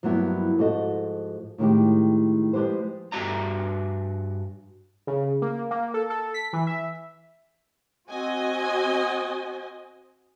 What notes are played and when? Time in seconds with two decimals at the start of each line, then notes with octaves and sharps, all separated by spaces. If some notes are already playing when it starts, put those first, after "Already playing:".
0.03 G2 F3 F#3 A#3 B3 E4
0.58 G#2 F3 F#4 A4 D#5
1.58 A2 D#3 G#3 G4
2.53 F3 G#3 G4 B4 C5
3.12 G2 F#4 D5 A#5
5.07 C#3
5.42 A#3
5.71 A#3
5.94 A4
6.10 A4
6.34 B6
6.53 E3
6.67 E5
8.08 C4 F#4 D#5 G#5